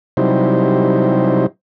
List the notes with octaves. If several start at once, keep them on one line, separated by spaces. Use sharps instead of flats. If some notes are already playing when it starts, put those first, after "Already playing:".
C3 F#3 G3 D#4 E4 C5